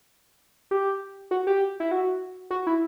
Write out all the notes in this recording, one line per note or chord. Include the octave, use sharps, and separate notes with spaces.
G4
F#4
G4
E4
F#4
F#4
E4